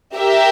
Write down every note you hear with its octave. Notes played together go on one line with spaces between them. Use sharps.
G4 A#4 E5